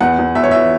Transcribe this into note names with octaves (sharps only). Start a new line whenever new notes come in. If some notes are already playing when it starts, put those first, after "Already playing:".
E2 F#5
E2
E2 E5
C#5
E3 E5